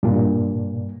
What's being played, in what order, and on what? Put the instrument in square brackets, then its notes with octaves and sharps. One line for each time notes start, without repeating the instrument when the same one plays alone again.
[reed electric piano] G2 A#2